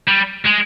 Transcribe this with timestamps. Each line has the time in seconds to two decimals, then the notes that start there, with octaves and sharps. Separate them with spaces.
0.08 G3
0.46 G#3